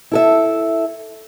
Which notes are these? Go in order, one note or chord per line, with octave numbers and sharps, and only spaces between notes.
E4 A4 E5